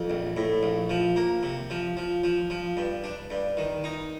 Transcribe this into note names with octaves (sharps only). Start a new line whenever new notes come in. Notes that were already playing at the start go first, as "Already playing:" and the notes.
Already playing: F2
A#1
A2
A#1
F3
A#3
C3
F3
F3
F3
F3
G2
D4
G2
D#3
D#4